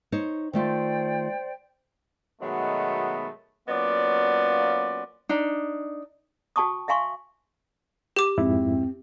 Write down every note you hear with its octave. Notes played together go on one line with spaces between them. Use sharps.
D#4 C5 C#5
D#3 A3 F4 C5 D5 G5
B2 D#3 F#3 G#3 A3 B3
F#3 A#3 B3 C#4 F4 D5
D4 D#4
F#4 G5 A5 C#6 D#6
E5 F5 G#5 C6 C#6
G4 D6
F2 G#2 C4 E4